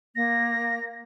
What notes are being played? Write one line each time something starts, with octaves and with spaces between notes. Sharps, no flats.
A#3 A#6